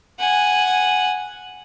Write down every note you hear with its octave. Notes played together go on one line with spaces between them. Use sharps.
F#5 G#5